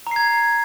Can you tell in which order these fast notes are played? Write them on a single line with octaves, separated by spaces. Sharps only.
A#5 C7 G#6